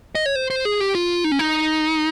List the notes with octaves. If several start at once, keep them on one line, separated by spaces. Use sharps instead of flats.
D#5
C#5
C5
C5
G#4
G4
F4
D#4
C#4
D#4